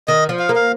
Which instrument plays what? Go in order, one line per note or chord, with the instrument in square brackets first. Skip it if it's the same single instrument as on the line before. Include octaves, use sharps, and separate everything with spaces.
[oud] D#3 [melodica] D#5
[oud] F3
[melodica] F5
[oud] A#3
[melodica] F5